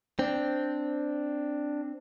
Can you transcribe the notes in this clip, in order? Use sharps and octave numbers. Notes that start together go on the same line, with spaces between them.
C4 D4